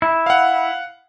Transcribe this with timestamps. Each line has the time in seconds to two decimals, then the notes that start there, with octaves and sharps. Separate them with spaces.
0.02 E4
0.26 F5 F#5